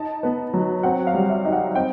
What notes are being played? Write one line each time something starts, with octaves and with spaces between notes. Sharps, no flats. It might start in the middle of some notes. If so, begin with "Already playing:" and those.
Already playing: D#4 A5
B3
F#3
C4 F#5
F5
G3
E5
D#4
F#5
C4 G5